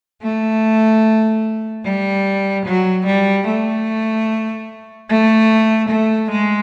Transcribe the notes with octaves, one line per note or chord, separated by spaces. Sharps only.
A3
G3
F#3
G3
A3
A3
A3
G#3